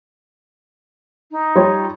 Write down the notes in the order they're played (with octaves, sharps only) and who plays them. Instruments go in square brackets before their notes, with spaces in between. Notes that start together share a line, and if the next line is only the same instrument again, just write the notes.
[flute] D#4
[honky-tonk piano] G3 F4 C#5